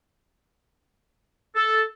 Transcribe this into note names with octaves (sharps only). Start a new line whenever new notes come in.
A4